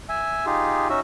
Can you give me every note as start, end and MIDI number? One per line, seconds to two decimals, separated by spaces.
0.09 0.46 76
0.09 0.46 80
0.46 0.88 63
0.46 0.88 65
0.46 0.88 67
0.46 0.88 68
0.89 1.00 61
0.89 1.00 63
0.89 1.00 66
0.89 1.00 76